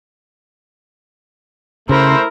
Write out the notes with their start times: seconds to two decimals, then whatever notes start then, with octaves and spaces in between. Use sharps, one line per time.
1.89 C#3 A3 E4 A#4 C5